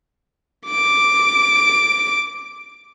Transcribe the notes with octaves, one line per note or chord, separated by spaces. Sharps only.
D6 D7